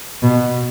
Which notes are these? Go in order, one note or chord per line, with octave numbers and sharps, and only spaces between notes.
B2